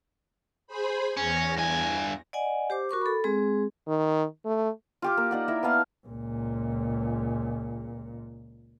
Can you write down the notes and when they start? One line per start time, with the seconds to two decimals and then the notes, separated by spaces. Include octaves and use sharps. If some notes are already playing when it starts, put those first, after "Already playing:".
0.67 G#4 C5 B5
1.17 E2 C#4 A#6
1.57 G2 G#5
2.33 D5 D#5 F#5 G#5
2.70 G4 C5 D6
2.89 F#4 A#4 C#6 D6
3.01 A4 B5
3.24 G#3 C4 G#4
3.88 D#3
4.45 A3
5.02 F4 G4 D6
5.17 A#3
5.31 D#4 D5 F#5
5.48 E4 A#4 E5
5.63 B3 D#5 F5 A5
6.07 C#2 A#2